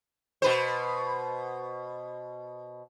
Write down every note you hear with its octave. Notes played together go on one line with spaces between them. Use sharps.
B2 B4 C5